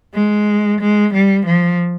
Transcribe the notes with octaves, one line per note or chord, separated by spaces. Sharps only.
G#3
G#3
G3
F3